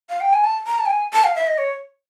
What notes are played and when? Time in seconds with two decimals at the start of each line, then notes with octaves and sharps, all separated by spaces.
0.10 F5
0.21 G5
0.33 G#5
0.44 A5
0.67 A#5
0.79 A5
0.86 G5
0.90 G#5
1.13 A5
1.24 F5
1.36 E5
1.47 D#5
1.58 C#5